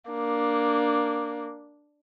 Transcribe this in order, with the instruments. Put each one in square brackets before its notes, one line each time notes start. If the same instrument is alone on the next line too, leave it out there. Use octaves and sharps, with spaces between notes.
[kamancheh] A#3 D4